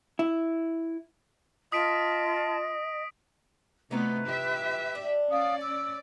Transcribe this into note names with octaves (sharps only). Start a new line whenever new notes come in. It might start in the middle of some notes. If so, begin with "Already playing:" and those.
E4
F4 D#5 A5 D#6 B6 D7
C3 E3 A3 B3 D#4 F4 B4
G4 E5
D4
C#4 D5 F5 D#6
D6 E6